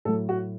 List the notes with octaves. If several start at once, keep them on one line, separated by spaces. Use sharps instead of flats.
A2 F#3 A4
F#4